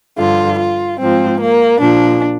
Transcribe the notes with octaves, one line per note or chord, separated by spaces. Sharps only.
G2 D3 F3 F4
F4
G#2 F3 C4
A#3
A#2 F3 D4